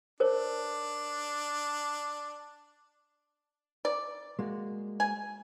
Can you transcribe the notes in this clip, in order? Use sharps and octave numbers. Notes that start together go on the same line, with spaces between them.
D4 A#4 C5 C#5
D5
G#3 A#3 F#4
G#5